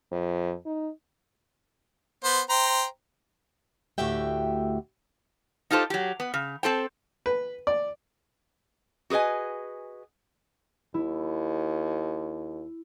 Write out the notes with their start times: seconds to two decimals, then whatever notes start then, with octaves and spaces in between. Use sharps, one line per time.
0.12 F2
0.66 D#4
2.24 B3 C5
2.50 C5 G5 A#5
3.98 D2 A2 F#4 G4 E5 G5
5.71 D#4 F4 G4 A4 C5
5.90 F#3 G4
6.20 B3
6.34 C#3
6.63 C4 A4 C5 G5
7.26 B4
7.67 D5
9.10 F#4 G#4 B4 D#5 G#5
10.94 D#2 E4